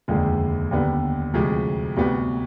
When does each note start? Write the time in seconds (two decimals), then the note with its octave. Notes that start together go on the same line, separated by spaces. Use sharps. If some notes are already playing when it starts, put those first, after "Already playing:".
0.08 F1 D#2 D3 F3 G#3
0.71 D#2 D3 G3 B3
1.34 D2 C3 F3 G#3
1.96 D2 C3 G3 B3